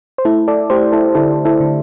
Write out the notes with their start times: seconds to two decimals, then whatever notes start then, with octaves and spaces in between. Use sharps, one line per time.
0.18 C5
0.25 A3 E4 A4
0.48 A4 D5
0.70 A3 G4 C5
0.92 E4 A4
1.15 D3 E4 A4
1.45 E4 A4
1.61 D3